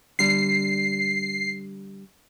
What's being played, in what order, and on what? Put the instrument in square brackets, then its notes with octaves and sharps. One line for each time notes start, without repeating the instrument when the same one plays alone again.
[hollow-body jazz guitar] D3 G3 [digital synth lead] C7